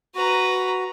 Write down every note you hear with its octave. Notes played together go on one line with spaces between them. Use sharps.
F#4 B4 A#5